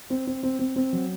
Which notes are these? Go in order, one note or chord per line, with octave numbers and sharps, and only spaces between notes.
C4
C4
C4
C4
C4
F#3